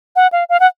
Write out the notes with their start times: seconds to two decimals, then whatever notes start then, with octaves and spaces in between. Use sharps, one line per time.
0.16 F#5
0.33 F5
0.49 F5
0.60 F#5